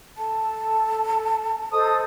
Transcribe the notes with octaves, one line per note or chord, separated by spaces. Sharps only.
A4 A5
A4 C5 D#5 D#6